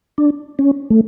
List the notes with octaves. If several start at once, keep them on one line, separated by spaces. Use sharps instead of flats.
D4
C#4
A3